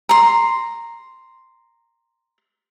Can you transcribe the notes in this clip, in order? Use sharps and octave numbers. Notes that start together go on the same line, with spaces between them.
A#5 C6